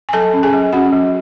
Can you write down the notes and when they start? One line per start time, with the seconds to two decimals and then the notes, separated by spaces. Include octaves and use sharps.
0.09 G#5
0.13 F#3 A4 A5
0.33 C#4
0.43 G#4 G#5
0.53 F#3
0.73 C#4 F#4 F#5
0.92 F#3